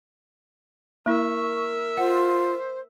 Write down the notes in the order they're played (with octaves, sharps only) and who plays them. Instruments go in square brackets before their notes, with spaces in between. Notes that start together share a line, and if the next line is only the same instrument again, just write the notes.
[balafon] A#3 E4 [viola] A#4 E5 [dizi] C#6
[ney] F4 [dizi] C5 [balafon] F#5